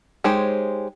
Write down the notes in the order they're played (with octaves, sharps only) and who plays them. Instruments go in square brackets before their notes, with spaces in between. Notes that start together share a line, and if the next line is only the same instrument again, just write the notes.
[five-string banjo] G#3 D#4 G4 C5 C#5